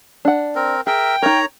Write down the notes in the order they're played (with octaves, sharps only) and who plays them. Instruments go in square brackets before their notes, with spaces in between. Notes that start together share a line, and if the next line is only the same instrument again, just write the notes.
[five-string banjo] D4 F#5
[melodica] C4 A#4
[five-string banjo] G#4 [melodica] A#4 E5 [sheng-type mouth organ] G5
[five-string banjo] D#4 A#4 [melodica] C#5 A#5